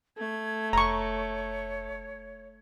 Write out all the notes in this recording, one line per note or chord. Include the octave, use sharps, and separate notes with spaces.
A3 G#6
F1 C#5 A#5 C#6